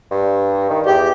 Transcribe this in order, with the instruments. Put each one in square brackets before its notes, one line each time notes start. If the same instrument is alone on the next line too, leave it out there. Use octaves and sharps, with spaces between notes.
[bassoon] G2
D#3
[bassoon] E2 [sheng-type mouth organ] G4